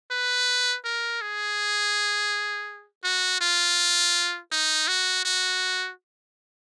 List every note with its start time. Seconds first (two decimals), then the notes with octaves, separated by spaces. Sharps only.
0.11 B4
0.85 A#4
1.21 G#4
3.04 F#4
3.41 F4
4.52 D#4
4.88 F#4
5.25 F#4